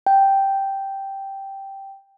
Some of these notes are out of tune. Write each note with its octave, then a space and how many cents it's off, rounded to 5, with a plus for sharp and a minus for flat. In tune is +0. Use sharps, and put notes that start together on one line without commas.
G5 -5